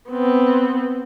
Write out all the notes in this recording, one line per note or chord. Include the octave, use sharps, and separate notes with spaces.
B3 C4